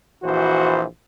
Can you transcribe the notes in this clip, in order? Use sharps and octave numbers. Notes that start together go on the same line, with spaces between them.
A#1 E3 F#4 C5